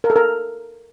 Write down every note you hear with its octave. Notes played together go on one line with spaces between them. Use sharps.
A#4
A4
A#4